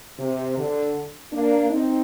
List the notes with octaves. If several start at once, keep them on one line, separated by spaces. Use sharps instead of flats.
C3
D3
A#3 D4
C4 D#4